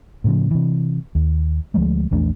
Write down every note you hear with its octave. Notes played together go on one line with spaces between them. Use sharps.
A2 C#3 F3
C3 E3
D#2
D2 F3 G#3 A3
A#1 E2 A3 D4